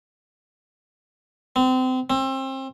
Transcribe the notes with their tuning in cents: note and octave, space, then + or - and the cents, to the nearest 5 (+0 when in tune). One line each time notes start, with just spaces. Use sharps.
C4 -30
C4 +30